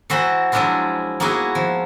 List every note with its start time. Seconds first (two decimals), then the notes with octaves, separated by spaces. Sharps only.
0.10 E3 E4 F#4 C5 A#5 B5
0.52 F3 F#3 G#3 D4 E4 F4
1.20 A#3 B3 D#4 E4 F#4 G#4
1.55 F3